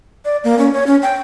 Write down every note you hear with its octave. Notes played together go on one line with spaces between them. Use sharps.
D5
A#3
C#4
C#5
C#4
G5